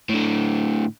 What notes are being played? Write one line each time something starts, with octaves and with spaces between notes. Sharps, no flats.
A2 D3